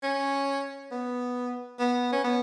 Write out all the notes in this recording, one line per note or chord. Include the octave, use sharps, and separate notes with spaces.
C#4
B3
B3
C#4
B3